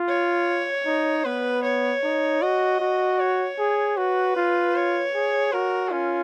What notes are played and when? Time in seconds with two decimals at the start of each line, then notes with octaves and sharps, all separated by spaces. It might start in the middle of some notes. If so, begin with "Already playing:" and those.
Already playing: F4
0.08 C#5
0.86 D#4
1.25 B3 B4
1.63 C#5
2.03 D#4
2.42 F#4 D#5
2.80 F#4
3.20 C#5
3.59 G#4
3.97 F#4 B4
4.36 F4
4.76 C#5
5.15 G#4
5.53 F#4 A#4
5.92 C#4 F4